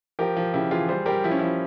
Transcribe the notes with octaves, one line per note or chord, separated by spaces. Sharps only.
F3 G4 A#4
F3
C#3 E4 G4
E3 F4 G#4
G3 G#4 C5
G3 G4 A#4
F3 E4
C#4
F3 E4